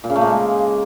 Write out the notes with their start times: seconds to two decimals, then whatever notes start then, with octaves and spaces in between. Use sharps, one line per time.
0.04 A#2
0.10 C#3
0.16 A3
0.21 A#3
0.27 G#3